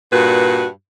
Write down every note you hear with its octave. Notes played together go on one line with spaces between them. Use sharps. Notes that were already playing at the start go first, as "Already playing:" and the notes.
G2 A#2 F#4 B4